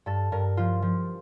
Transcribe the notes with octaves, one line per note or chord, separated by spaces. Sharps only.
G2 A4
G2 A#4
F3 F4
F3